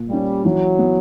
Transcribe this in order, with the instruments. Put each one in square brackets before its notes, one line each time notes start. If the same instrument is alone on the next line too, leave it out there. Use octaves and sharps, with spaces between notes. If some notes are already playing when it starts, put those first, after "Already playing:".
Already playing: [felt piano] A#2
[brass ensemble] G3 [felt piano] A#3 C#4
[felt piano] E3 [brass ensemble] F#3
[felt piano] B3 E4